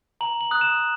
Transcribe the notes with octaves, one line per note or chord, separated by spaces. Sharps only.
A#5 F#7
F#7
D#6 F#6
E7